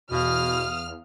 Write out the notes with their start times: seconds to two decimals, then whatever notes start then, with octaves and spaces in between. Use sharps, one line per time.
0.11 E2 B2 F5 D#6 F6